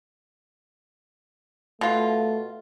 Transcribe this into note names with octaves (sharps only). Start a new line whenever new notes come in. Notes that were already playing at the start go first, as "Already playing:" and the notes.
B2 A3 F4